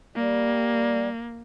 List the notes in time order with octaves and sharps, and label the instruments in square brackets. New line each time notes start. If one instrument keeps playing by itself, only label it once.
[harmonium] G3 [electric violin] A#3